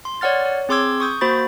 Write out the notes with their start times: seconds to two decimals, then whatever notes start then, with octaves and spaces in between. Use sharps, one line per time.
0.05 C6
0.21 C#5 D5 F#5 F6 A6
0.45 C#5
0.69 C4 G#4 C6 D6 E6 G#6
1.00 C#6 D#6 G6
1.21 A#3 F#4 C5 B5 A6